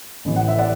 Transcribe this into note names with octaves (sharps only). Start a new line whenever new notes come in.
A1 A2 E3
F#5
E5
D5 F#5